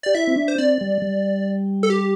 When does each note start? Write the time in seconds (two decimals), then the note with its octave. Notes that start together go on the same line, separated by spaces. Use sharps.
0.03 G4 D5
0.15 E4 E5
0.27 C4
0.36 D4
0.48 C5
0.58 C4 D5
0.81 G3
1.02 G3
1.83 A4
1.90 G4